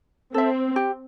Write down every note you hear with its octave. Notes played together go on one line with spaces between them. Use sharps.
C4 A4 E5
G4